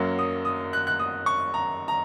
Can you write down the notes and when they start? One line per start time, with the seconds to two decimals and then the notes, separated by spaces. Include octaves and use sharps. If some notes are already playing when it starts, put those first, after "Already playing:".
Already playing: F#2 F#3 A#3
0.19 D#6
0.45 D#6
0.73 F#6
0.87 F#6
1.00 D#6
1.26 C#6
1.54 A#5
1.88 A#5